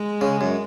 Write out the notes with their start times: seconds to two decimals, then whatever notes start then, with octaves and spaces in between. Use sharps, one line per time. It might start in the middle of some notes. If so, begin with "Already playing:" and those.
Already playing: G#3
0.21 C#3
0.41 F#2